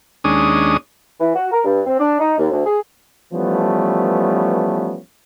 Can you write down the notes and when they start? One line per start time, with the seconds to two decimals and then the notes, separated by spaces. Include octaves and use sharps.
0.24 D#2 G#3 C#4 D4 D#6
1.20 E3
1.36 F#4
1.52 A#4
1.65 G2
1.86 C4
1.99 D4
2.20 D#4
2.39 D#2
2.51 D2
2.66 G#4
3.34 E3 F3 G3 A3 B3 C#4